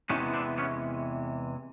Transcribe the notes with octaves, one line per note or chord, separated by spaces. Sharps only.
E2 C3 E3 G#3 B3 C#4 D#4
C4 D4
B3 C#4